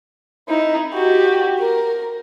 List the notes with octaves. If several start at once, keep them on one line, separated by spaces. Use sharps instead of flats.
D#4 E4
F#4 G4
A#4